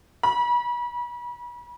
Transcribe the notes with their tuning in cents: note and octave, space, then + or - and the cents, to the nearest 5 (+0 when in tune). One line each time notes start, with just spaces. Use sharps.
B5 -40